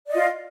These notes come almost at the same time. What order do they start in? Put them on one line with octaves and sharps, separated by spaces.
D5 D#5 F4